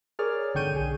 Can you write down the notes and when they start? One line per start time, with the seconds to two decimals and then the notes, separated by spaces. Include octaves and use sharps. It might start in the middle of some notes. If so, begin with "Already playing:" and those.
0.19 G#4 A#4 C#5 D5 F6
0.54 G#1 D3 G5 C#6 G6 D#7
0.74 B1 G#4